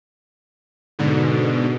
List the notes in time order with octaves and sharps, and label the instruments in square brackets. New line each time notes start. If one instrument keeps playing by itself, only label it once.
[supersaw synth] G#2 B2 D3